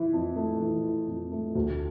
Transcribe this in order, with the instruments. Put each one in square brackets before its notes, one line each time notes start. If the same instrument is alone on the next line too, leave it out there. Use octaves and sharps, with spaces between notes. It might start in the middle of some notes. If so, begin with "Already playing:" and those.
Already playing: [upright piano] E3 E4
F2
A3
E3
E4
F2
A3
D2